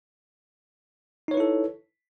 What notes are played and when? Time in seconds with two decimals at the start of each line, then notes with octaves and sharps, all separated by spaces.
1.28 D#4
1.31 C#5
1.34 B4
1.37 E4
1.40 A4